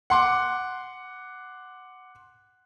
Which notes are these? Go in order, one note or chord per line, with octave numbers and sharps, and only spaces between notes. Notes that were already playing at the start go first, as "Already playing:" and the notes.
F#5 C6 D6